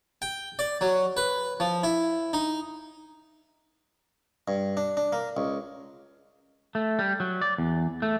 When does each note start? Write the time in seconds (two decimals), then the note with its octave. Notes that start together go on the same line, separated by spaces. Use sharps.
0.22 G5
0.59 D5
0.81 F#3
1.17 B4
1.60 F3
1.83 E4
2.33 D#4
4.48 G2
4.77 D4
4.97 D4
5.13 A#3
5.37 C#2
6.75 A3
6.99 G3
7.20 F#3
7.41 D5
7.58 E2
8.02 A3